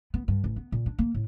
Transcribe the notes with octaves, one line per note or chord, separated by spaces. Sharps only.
B3
G2
A1
B3
A#2
D4
A#3
A2